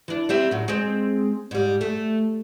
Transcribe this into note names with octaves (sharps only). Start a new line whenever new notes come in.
E3 D4
G3 C4 E5
A2 F#3
G#3 C4
G#2 G3
A3